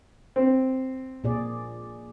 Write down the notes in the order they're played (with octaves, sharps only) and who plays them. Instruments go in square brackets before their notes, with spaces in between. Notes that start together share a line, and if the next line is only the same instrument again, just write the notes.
[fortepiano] C4
[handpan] A#2 G#4 D5